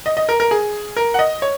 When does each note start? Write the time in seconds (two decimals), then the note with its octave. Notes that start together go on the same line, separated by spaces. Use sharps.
0.06 D#5
0.17 D#5
0.29 A#4
0.40 A#4
0.51 G#4
0.96 A#4
1.14 F#5
1.19 D#5
1.42 C#5